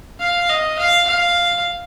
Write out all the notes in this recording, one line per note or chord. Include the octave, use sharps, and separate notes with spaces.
F5
D#5
F5
F5